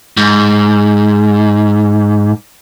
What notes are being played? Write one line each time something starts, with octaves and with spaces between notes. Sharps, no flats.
G#2